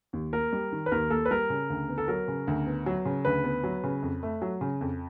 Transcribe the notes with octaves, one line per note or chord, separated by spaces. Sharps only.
D#2
A#3 A#4
G3
D#3
B4
D#2 A#4
A#3 A4
B4
G3 A#4
C#3
D2
B3
A4
F#3 A#4
C#3
D2
B3
F#3
C#3
D2 B4
B3
F#3
C#3
F2
A3
F#3
C#3
F2